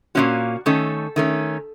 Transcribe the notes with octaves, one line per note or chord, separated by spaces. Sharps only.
A#2 F3 A#3 C#4 F#4
D#3 A3 C#4 A4
D#3 A3 C#4